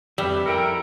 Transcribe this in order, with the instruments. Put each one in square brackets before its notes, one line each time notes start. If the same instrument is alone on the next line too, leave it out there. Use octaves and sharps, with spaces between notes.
[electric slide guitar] F2 B4 E5 [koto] G3
[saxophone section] D#4 E4 A#4 [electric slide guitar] A4 G5